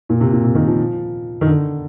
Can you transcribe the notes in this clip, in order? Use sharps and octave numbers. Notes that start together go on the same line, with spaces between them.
A#2
C3
A#2
C3
D#3
F3
D#3
D3